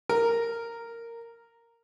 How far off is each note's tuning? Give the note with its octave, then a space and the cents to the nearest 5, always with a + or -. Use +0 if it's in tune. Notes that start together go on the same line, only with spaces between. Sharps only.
A#4 -10